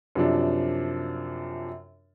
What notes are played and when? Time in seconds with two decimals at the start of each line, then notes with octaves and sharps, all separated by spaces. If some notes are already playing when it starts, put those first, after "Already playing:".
0.15 F#2 C3 F3 D4